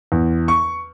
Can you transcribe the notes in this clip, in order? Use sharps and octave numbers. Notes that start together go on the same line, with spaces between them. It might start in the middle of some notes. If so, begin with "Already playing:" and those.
E2
C#6